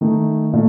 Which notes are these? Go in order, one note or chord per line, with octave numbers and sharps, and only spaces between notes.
D#3 A3 D#4
A#2 A3